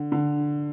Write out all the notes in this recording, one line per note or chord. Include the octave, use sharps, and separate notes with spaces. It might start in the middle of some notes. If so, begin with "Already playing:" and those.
Already playing: D3
D3